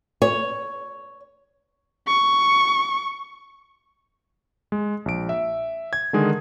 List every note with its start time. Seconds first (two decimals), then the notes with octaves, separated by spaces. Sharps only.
0.22 C#5
2.07 C#6
4.72 G#3
5.06 A#1 D7
5.29 E5
5.93 G#6
6.13 D3 D#3 G#3 G#4 A#4